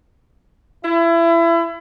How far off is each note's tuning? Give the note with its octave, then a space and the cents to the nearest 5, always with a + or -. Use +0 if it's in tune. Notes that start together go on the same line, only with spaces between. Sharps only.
E4 +30